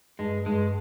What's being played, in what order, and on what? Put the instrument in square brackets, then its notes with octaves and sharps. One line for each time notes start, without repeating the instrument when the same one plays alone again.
[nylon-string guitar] G2 [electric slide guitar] G#3
[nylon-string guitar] G2 [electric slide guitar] G#3